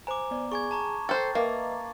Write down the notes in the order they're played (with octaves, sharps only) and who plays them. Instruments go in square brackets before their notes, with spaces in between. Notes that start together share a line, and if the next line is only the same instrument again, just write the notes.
[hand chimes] C5 G#5 [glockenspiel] A#5 D6
[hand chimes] B3 D5
[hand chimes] G#4 G#5 [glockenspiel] C#6 G#6
[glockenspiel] A5 A#5 C#6
[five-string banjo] A4 C5 [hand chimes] G5 [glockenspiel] A6
[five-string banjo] A#3 [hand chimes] B4 D#5 E5